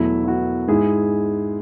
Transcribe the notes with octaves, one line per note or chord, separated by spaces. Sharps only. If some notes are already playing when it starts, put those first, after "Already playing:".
Already playing: E2 B2 F#3 A3 E4
E4
F#4
G#2 G#3 E4 G#4